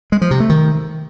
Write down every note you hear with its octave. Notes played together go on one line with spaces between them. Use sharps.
G#3
F3
C3
A3
D#3